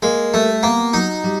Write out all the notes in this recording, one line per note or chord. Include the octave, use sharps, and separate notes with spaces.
G#3 A#3
G3 A3
A#3 B3
F#3 D#4
G3